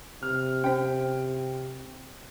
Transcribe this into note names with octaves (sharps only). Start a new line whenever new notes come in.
C3 F6
C#4 C5 G5